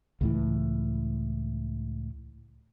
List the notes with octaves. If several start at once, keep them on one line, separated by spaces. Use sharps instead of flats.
C#2 A2 E3